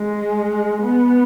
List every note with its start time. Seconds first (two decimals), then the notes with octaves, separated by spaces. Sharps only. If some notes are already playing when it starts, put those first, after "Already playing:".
Already playing: G#3
0.82 B3